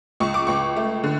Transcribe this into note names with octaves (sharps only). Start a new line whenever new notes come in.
C#2 C#6
D6
C#2 C#6
A3
D3